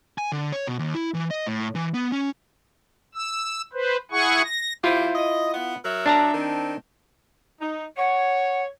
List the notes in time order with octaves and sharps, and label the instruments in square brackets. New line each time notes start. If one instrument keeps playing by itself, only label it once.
[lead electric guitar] G#5
D3
C#5
B2
D#2
E4
E3
D#5
A2
E3
B3
C#4
[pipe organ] E6
B4 C5
E4 G#4 F#5 G#5 C#6
A#6
[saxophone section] F3 G4 C5 [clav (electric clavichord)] E4 F4
[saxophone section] D#5
B3
F#3 A#4 E5
[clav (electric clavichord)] D4 A5 A#5
[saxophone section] D#3 C4
[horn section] D#4
[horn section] C#5 [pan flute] F#5